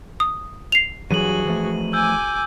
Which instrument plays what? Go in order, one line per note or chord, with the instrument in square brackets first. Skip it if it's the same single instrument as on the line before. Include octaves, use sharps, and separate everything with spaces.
[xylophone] D#6
C7 F7
[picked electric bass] G2 E3 F#3 [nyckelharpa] F#4 G#4 [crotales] D#7 F#7
[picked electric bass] E3 F3 A3
[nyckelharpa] G#5 D6 [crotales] E6 G6